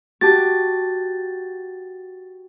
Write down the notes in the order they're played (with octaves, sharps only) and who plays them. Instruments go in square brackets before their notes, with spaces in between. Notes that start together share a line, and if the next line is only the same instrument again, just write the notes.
[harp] F#4 G4 A5 [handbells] A6